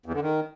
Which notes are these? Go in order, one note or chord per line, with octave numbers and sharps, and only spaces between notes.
E2
D3
D#3